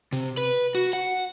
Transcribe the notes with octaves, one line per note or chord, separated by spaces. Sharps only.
C3
B4
F#4
F#5